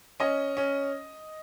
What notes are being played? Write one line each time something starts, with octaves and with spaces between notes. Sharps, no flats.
C#4 D#5
C#4